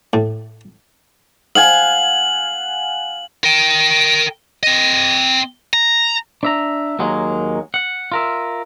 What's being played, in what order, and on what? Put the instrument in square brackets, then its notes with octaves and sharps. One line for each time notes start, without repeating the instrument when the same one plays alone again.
[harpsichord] A2
[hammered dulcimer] F5 F#5 G#5 [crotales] F#7
[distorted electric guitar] A#4 G5
C4 D#5
A#5
[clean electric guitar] D4 E5 A#5
D#2 F#3 G#3 A#3
F#5
F4 A#4 E5